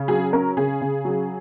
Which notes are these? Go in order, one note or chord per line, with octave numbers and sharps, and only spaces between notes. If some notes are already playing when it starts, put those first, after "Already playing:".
Already playing: C#3
F#3 G#4
C#4 A#4
C#3 G#4
C#3
F#3